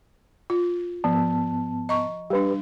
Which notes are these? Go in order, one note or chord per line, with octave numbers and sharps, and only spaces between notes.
F4
G#2 F3 B3 A5
D#5 A#5 C#6
G3 D4 G4 B4